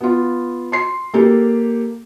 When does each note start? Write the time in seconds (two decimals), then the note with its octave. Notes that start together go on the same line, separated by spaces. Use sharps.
0.01 B3 F4
0.72 C6 C7
1.14 A#3 G4 A4